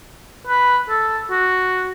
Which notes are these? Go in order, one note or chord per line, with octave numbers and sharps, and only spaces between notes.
B4
A4
F#4